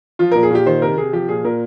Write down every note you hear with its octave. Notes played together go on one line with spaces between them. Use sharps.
F3 F4
A#2 A#4
G#4
A#2 G4
D#3 C5
C3 A#4
C3 G#4
F3 G4
A#2 G#4
A#2 A#4